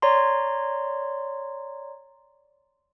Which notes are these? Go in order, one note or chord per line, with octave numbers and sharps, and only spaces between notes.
C#5 D5 A#5 C6